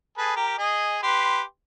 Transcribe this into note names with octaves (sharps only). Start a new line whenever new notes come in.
G#4 A4 B4
G4 A#4
G#4 D#5
G4 B4 C6